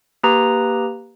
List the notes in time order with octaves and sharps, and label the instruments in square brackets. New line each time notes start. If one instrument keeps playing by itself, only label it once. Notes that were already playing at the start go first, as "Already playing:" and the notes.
[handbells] A#3 G4 B4 A#5 D#6